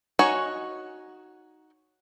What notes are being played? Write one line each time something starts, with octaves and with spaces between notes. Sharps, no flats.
D#4 F#4 C#5 G#5